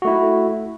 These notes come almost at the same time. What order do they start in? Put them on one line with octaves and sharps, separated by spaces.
F#4 A3 E4